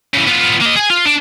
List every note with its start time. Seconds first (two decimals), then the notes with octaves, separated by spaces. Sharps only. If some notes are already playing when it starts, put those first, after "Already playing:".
0.14 C#3 E3
0.27 B3 F4
0.61 A#3 D#5
0.76 G#4 G#5
0.90 F4
1.06 D4